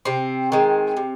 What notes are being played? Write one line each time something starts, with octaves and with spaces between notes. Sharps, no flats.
C3 C4
D#3 G#3
C3